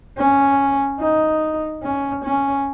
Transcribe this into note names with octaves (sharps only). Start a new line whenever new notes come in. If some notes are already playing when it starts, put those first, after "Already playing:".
C#4
D#4
C#4
C#4